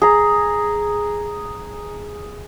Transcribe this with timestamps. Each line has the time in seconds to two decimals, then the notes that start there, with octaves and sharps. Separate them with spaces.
0.02 G#4 A#5